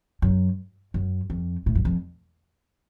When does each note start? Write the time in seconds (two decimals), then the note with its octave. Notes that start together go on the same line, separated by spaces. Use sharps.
0.22 F#2
0.94 F#2
1.30 F2
1.66 A2
1.75 F#2
1.85 F2